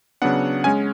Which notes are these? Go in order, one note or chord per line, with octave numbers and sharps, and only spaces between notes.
C#3 F#3 B3 D4 F#5
G#3 C#4 G#5